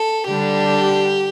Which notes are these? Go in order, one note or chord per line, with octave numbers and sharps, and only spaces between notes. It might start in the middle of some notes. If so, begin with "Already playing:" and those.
Already playing: A4
D3 G3 D4 G4